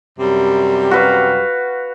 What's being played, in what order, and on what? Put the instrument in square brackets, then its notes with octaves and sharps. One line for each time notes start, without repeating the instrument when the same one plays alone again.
[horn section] F#2 C3 G3
[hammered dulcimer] F#4 B4 F5